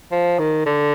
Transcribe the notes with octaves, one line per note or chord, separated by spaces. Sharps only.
F3
D#3
D3